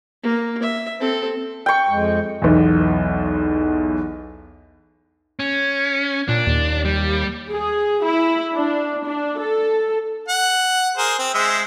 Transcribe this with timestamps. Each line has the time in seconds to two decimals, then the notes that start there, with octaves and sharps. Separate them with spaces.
0.23 A#3
0.62 E5
1.00 C4 A4
1.66 G5 C#6
1.89 F2 G#3
2.42 B1 E2
5.39 C#4
6.29 A#2 D4
6.47 D#2
6.85 G3
7.51 G#4
8.05 E4
8.55 D4
9.06 D4
9.40 A4
10.29 F#5
10.98 G#4 A#4 C5
11.19 C4
11.34 G#3 C5 E5